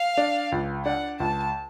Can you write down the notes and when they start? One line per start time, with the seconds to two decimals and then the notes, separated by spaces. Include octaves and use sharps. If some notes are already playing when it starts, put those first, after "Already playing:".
Already playing: F5
0.17 D4
0.52 C#2
0.85 D4 F#5
1.20 C#2 A5